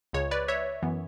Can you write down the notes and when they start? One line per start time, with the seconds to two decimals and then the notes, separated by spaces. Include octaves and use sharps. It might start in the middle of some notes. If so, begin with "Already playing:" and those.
0.13 C#2 C#3 G#3 C#5
0.31 B4 D5
0.48 C#5 E5
0.82 F#2 E3 B3